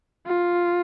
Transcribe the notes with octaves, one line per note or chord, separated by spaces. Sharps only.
F4